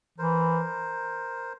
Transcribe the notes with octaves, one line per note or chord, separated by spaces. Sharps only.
E3 A#4 C5